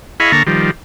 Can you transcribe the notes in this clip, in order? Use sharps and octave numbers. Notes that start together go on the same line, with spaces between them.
E4 G#4 D#5 F5 B5 C#6
D3 A#3 A4 A#5 C#6
D#3 F3 G3